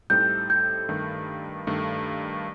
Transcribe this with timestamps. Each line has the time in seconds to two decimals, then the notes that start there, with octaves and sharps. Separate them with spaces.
0.10 A2 G3 C4 D#4 A4 G6
0.50 G6
0.89 G2 D#3 A3
1.67 G2 D#3 A3